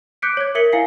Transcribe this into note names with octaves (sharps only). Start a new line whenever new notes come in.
D6 F#6 G6 B6 C#7 D7
C#5 D6 G#6
A#4 E5 B6 C#7 F#7 G7
E4 F5 G#5 C7 C#7